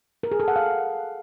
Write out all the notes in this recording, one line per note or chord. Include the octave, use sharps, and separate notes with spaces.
A#4
G#4
A4
F#5
F5